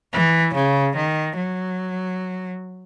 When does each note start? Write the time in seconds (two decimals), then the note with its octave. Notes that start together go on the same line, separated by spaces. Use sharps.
0.13 E3
0.54 C#3
0.96 D#3
1.37 F#3